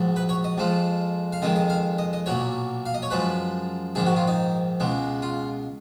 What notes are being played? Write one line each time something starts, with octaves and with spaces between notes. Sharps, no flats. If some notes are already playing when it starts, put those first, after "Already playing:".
Already playing: A#1 G#2 F#3
B4
C#5
D#5
F2 F3 G#3
F5
F2 D#3 G#3 D#5
D#5
F5
D#5
D#5
B1 A#2 F#3 C#5
F5
D#5
C#5
F#2 F3 G#3 B4
A#1 G#2 D#3 G#4
F#4
F4
D#4
C#2 B2 G#3
F4